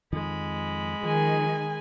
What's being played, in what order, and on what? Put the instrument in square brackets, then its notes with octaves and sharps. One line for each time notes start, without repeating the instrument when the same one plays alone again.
[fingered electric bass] F2 D#3 F3 [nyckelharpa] G#3 B5
[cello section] D#3 [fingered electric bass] F3 [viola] G#4 G#5